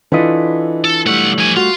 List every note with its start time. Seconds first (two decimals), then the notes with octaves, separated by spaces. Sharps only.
0.12 E3 D4 F4 A4 B4 D#5
0.84 A4
1.06 B1 G3 A3 F#5
1.38 F3 G#5
1.56 F4 F#4